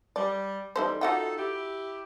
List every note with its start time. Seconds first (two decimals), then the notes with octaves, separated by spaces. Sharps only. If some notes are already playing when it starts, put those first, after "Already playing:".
0.16 G3 D5
0.76 E2 G3 D#4 A4 C5
1.01 D#4 F4 F#4 A4 F#5 G5
1.37 E4 G4